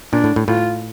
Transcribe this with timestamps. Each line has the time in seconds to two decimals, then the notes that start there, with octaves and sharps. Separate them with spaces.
0.13 A#2 D4
0.24 A2
0.36 A2
0.48 A2 F4